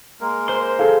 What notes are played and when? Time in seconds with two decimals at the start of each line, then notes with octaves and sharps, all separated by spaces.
0.21 G#3 A#3 A#4
0.48 C5 C6
0.79 G#4 A4 F5